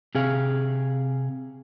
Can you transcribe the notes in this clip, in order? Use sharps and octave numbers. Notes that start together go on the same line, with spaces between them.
C3 G#4 F5